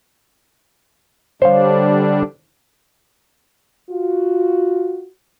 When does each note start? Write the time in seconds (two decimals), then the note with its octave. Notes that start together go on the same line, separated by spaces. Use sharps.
1.42 D3 G3 D4 C5 C#5 F5
3.90 F4 F#4